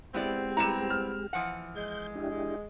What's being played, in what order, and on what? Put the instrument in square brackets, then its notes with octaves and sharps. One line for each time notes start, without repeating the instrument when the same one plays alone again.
[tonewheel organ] G#3 G4 [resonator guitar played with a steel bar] B3 E4 D5 [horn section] C4
[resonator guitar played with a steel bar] G3 B3 E4 [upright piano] A#5 E7
[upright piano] F6
[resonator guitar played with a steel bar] E3 F3 F#5
[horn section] G#3 [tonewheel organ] G6
[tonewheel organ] D4 E4 G4